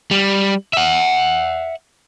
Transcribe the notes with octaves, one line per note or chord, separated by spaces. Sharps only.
G3
E5 F#5